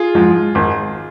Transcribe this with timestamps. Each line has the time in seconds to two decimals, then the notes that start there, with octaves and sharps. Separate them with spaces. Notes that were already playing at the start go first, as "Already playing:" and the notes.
Already playing: F4 G#4
0.15 G#2 F3 G#3
0.55 G#1